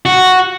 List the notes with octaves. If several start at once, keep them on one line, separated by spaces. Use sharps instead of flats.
F#4